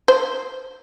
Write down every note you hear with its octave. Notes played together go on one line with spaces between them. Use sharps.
C5